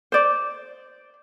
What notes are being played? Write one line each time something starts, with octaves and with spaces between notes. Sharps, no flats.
C5 D5